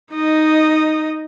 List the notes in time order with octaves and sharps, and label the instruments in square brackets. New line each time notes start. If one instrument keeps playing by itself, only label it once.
[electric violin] D#4 D#5